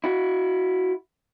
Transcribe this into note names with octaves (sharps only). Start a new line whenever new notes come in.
E4 F#4